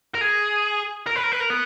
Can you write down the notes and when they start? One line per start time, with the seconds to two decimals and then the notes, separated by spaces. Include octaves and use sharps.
0.15 A#4
0.21 G#4
1.07 A#4
1.16 B4
1.24 A#4
1.32 B4
1.40 A#4
1.50 B3